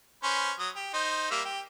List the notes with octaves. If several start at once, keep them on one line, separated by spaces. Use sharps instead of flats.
C#4 B4 C5
F#3 D#6
G4
D#4 C5
G3 A#3 E5
G4